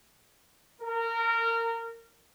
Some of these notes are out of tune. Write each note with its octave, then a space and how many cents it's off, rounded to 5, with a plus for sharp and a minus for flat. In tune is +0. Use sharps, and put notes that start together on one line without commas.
A#4 -20